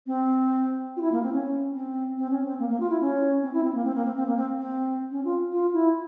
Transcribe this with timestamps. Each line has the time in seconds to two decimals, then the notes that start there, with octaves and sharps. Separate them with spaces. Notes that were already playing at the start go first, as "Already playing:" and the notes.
0.07 C4
0.97 F4
1.01 E4
1.12 A#3
1.23 C4
1.33 C#4
1.75 C4
2.17 C4
2.30 C#4
2.44 C4
2.59 A#3
2.69 A#3
2.80 F4
2.90 E4
3.01 C#4
3.43 C4
3.53 E4
3.64 C4
3.74 A#3
3.85 C4
3.95 A#3
4.05 C4
4.16 C4
4.27 A#3
4.37 C4
4.58 C4
5.11 C#4
5.25 F4
5.52 F4
5.73 E4